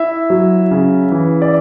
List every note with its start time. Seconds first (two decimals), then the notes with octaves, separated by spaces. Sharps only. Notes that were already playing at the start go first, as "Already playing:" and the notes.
Already playing: E4 E5
0.30 F#3
0.71 C#3
1.12 E3
1.42 D5